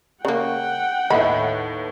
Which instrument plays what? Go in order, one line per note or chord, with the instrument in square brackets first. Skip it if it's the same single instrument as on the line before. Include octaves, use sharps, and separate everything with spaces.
[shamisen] C#3 A#3 [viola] F#5 G5
[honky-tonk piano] D#2 A2 B3 [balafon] D#5 E5 [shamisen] B5